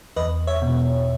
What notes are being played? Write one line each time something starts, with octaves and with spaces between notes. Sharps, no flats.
E2 B4 D#5
C#5 E5
B2